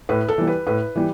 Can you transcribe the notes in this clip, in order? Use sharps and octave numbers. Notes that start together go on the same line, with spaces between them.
A2 B4
A4
E3 G3
B4
A2 B4
E3 G3